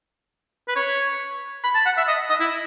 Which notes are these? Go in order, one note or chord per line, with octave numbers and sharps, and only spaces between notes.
B4
C#5
B5
A5
F#5
E5
D#5
D#5
E4